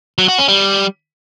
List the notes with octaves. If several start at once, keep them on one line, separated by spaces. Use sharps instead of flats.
F#3
F#4
C#4
G3